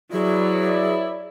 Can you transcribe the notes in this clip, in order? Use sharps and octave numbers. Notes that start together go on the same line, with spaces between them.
F#3 E4 G#4 B4 C#5 D5